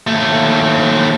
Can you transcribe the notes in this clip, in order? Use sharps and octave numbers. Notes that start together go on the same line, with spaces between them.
D#2 A3